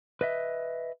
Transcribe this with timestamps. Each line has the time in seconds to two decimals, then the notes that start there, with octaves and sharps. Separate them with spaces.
0.21 B4 D#5 E5